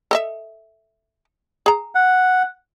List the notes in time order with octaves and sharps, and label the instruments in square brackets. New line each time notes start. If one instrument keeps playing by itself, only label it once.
[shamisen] A4 D#5 E5
G#4 A#5
[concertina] F#5